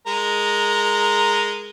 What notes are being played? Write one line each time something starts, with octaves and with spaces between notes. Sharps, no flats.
G#3 A#4